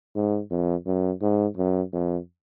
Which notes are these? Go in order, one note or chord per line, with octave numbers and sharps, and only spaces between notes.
G#2
F2
F#2
G#2
F#2
F2